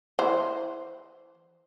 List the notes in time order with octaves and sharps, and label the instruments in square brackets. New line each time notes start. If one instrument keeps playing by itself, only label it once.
[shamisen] E3 C5